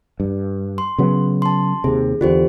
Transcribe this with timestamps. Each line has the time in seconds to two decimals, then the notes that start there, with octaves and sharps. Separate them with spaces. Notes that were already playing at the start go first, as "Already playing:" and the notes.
0.20 G2
0.78 C6
0.98 C#3 F#3 B3
1.42 A5 C6
1.84 D#2 C3 G#4
2.21 E2 D3 F4 G4 C5